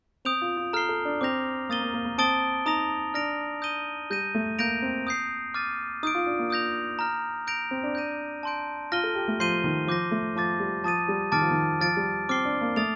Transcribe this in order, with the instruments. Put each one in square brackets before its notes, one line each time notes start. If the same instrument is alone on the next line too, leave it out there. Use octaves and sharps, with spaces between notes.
[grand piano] C4 [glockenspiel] D#6 G6 D7 F7
[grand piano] F4
F4
[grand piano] A4 [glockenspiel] A#5 F6 C7 G7
[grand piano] A4
D4
[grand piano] C4 [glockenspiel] D6 G6 A#6 F7
[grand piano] A#3 [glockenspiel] D#6 A6 D#7 G7
[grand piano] A#3
A#3
A#3
[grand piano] C4 [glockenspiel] A5 D#6 A6 D7 G7
[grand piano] D#4 [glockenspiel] A#5 D#6 A#6 F7
[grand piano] D4 [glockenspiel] F6 A#6 D7 F7
[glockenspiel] D#6 G6 A#6 D#7 G7
[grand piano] G3 [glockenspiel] G6 A#6 D#7
[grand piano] A3
[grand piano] A#3 [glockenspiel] G6 A#6 D7 F7
[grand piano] C4
[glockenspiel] D#6 G6 C7
D6 F6 A6 D#7
[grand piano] D#4 [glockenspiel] D#6 G6 D7
[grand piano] F4
D4
A#3
[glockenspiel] D#6 G6 A#6 F7
A#5 F6 A#6
G6 A#6 D7 F7
[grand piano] C4
D4
[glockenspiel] G6 A#6 D#7
A5 C6 G6 D7
[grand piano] F4 [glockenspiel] F6 A#6 D#7 G7
[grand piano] A4
G4
A3
[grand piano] F3 [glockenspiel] C6 G6 C7 D#7 G7
[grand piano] D#3
[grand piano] F3 [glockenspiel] D6 G6 A#6
[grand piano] A3
[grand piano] F3 [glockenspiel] A5 D6 A6
[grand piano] G3
[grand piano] F3 [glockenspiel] A5 D#6 A6 D#7
[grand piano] G3
[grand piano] D#3 [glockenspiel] A5 D6 F6 A6 D7
[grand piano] F3
D#3
[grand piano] F3 [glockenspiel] F6 A6 D7
[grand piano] G3
[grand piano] C4 [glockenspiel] D6 F6 C7 G7
[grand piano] D4
A#3
[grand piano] A3 [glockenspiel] D#6 A6 D7 F7